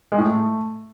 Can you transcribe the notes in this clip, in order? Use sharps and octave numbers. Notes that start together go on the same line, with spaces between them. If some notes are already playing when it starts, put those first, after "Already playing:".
G#3
A2
A3